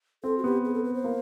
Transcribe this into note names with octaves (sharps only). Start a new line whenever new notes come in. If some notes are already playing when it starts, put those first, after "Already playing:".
C4 A4
F#4
B3 G4
G#4
A4
B4
C5
A#3